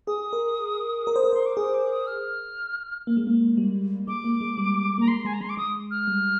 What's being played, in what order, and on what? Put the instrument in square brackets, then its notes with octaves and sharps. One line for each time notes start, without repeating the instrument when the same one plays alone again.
[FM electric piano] G#4 [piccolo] D#6
[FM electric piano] A#4
A#4
C5
A#4
[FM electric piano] C5 [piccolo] C6
[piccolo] D6
[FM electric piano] G#4 [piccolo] D#6
[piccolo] D6
D#6
F6
[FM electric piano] A#3
G#3
A#3
G3
[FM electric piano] G#3 [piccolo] D6
[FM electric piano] A#3
G#3
G3
[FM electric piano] A#3 [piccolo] A#5
[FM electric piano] G#3 [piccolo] C6
[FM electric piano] G#3 [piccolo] G#5
[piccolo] A#5
[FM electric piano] G#3 [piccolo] C6
[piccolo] D6
[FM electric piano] G#3 [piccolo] D#6
[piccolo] F6
[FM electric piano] G3